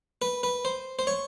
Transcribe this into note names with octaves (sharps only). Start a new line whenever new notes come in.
B4
B4
C5
C5
C#5